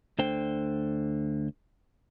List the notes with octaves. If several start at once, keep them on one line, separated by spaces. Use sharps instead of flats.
D2 D3 C5 G5